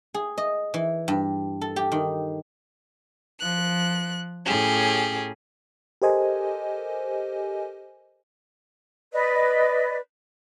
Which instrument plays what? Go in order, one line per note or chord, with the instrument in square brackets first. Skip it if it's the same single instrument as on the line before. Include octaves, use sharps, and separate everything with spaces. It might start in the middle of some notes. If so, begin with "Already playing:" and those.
[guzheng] G#4
D#5
E3
G2
A4
G4
D#3
[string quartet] F3 F#6
A2 C#4 G4 G#4
[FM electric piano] G4 A4 A#4 C5 D#5 G#5
[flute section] B4 D5 D#5